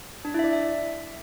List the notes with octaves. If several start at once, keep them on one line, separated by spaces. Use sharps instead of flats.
D4
E4
E5
D5
E5